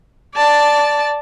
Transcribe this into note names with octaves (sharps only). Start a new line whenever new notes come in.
D5 A5